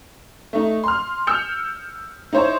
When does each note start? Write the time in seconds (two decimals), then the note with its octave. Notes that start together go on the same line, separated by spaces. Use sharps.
0.53 A3 D#4
0.84 C6 F6
1.27 E6 F6 G6 C#7 F7
2.33 D#4 E4 C5 C#5